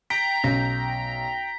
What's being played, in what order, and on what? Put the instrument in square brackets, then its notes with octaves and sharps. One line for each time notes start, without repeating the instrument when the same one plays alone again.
[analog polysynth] G5 A#5 [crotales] B6 [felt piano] D7
[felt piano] B1 [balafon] C#4